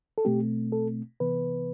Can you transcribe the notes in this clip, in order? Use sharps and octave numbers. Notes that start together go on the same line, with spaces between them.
A4
B2 A3 C4 G4
A4
C3 E3 B3 B4